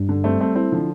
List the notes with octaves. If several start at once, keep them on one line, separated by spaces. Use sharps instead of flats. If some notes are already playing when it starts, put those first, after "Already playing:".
Already playing: G2
D3
G3 A3 C4
A3 C4
A3 C4 E4
D3 F3